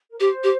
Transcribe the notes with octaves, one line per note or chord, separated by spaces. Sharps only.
A#4
G4 C5
G4